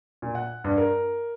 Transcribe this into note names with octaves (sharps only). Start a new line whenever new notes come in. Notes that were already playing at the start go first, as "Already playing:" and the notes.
A#2
F#5
G2
A#4